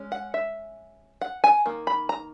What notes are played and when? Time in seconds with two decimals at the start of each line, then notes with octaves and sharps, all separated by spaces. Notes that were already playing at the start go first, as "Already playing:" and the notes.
Already playing: G#3 C#4
0.12 F#5
0.34 E5
1.21 F#5
1.44 G#5
1.66 D#3 A#3
1.87 B5
2.09 A#5